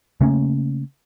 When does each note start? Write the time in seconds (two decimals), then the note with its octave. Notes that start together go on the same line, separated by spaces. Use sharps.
0.21 C#3 A3 A#3 C#4